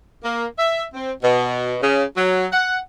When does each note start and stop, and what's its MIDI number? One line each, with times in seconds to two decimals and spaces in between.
0.24 0.45 58
0.59 0.84 76
0.94 1.12 60
1.23 1.77 47
1.82 2.04 49
2.16 2.46 54
2.52 2.78 78